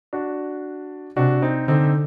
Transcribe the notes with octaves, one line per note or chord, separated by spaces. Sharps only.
D4 F#4
C3 D4 F#4
C4 D#4
D3 C4 D#4